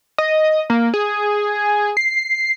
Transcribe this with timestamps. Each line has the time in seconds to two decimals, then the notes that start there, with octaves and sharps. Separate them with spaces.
0.18 D#5
0.70 A#3
0.94 G#4
1.97 C7